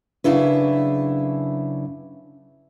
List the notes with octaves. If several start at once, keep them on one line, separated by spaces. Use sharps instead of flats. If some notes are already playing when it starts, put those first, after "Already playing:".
F#2 C#3 D4 E4 B4